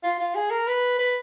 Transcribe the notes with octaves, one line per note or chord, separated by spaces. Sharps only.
F4
F4
G#4
A#4
B4
B4